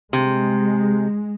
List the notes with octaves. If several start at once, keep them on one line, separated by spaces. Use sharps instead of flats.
C3 G#3